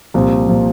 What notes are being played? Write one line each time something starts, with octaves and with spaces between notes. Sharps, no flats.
C2 A#2 F3
A#2 F3